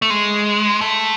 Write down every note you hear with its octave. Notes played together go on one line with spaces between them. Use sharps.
A3
G#3
A3